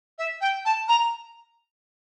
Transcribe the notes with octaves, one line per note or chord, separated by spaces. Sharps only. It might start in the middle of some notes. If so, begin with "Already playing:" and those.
E5
G5
A5
A#5